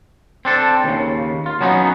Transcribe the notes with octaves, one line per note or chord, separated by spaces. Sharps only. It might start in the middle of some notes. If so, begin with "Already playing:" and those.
C4 D4 A4
D#2 C#3
F4
F#3 B3 C#4 D#4